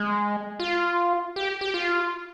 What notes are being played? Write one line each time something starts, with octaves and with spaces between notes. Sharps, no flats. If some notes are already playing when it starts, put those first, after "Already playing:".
Already playing: G#3
F4
G4
G4
F4